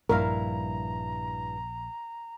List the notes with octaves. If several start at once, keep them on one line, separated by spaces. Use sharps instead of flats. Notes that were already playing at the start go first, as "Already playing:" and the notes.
A#1 G2 E4 A#4 F5 A#5